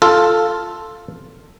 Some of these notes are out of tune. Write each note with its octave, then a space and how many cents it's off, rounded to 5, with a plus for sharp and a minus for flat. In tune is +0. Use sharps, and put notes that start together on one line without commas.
F4 +0 A4 +0